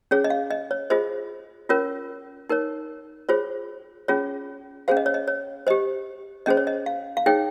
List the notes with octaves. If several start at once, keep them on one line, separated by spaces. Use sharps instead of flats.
C#4 G#4 C#5
D#5
F5
D#5
C#5
F4 G#4 C5 D#5
C#4 F4 A#4 C#5
D#4 A#4 C#5
F4 G#4 C5 C#5
C#4 F4 G#4 C#5
C#4 G#4 C5 F5
D#5
C#5
D#5
C#5
G4 C5 D#5
C#4 G#4 C5 D#5
C#5
D#5
F5
F5
D#4 G#4 C#5 G5